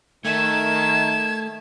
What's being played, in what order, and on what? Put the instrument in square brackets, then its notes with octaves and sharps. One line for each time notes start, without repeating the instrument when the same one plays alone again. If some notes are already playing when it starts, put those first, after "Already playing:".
[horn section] D#3 [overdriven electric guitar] A3 [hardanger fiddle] E5 A5 [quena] G#6